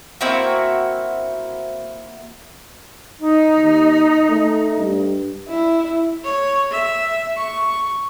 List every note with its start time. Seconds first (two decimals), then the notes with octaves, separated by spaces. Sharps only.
0.21 A#3 C4 E4 F#4
3.19 D#4 D#5
3.55 D#2
4.29 A3
4.77 G2
5.49 E4
6.24 C#5
6.71 E5
7.37 C#6